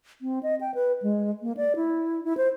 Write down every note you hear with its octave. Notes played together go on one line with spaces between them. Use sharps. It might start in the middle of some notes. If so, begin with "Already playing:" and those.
C4
D#5
G5
B4
G#3
A#3
D5
E4
E4
C5